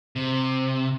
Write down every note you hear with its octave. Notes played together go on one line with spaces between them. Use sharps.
C3